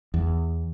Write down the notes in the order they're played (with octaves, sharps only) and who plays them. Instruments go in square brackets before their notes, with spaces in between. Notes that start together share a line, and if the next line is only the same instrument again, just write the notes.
[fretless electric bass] E2